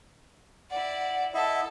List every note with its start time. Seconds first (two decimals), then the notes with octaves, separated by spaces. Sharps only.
0.70 E4 D5 F#5
1.34 E4 A4 D#5 E5